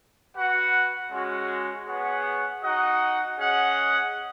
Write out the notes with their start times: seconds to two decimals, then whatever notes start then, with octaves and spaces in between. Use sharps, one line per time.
0.35 F#4 B4 F#5
1.10 G#3 C#4 F#4
1.86 B3 G#4 C#5 F#5
2.63 D#4 F#4 D#5 F#5
3.39 C#4 G#4 D#5 F#5